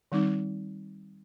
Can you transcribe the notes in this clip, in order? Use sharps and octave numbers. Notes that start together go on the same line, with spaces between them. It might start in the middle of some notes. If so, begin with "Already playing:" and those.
D#3 G3 C4 D#4